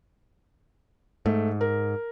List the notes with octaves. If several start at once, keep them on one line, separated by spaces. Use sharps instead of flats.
G#2 A3
A#4